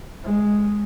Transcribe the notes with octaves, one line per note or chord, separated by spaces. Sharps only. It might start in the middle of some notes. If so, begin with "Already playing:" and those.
G#3